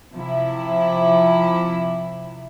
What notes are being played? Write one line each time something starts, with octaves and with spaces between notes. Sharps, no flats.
C3 F3 E4